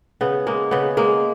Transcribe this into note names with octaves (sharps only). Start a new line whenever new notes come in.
C#3 B3
G#3 A#3
C#3 B3
G#3 A#3